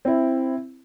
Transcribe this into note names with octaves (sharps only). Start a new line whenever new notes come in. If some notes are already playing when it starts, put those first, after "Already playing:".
C4 E4